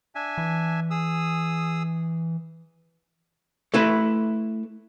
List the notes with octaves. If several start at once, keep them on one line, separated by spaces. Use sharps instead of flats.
D4 E5 G#5
E3
G#4 D#6 E6
A3 E4 B4